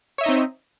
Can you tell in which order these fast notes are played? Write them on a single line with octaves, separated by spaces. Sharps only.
C#5 E5 D#5 D#4 C4